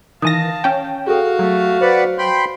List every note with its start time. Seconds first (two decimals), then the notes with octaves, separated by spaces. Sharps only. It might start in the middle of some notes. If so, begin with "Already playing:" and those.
0.22 D#3 E3 F5 A5 D#6 A#6 D#7
0.64 C#4 G5
1.07 F#4 G#4 A4 F5
1.39 F#3 A3
1.81 B4 C5 D5 F#5
2.18 G5 B5 C6